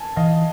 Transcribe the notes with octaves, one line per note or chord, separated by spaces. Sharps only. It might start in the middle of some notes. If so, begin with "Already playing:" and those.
Already playing: G#5 A5
E3 D#5 F5